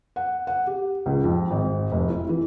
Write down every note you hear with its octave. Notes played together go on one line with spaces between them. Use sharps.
F#5
F#5
G4
C#2
F2
G#1
F1
E4
E3